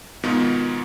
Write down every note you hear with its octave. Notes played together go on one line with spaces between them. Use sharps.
G#2 B2 D#3 B3 F4